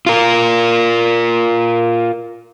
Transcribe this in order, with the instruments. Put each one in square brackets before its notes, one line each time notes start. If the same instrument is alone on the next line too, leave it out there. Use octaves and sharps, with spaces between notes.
[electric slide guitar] F4 A#4